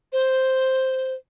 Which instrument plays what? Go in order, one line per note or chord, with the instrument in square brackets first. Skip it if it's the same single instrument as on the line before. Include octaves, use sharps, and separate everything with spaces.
[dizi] C5